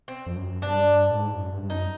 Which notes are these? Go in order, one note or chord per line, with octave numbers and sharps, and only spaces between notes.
C4
F2
F#2
G2 D4
A2
G#2
F#2
G2
G2
F#2 D#4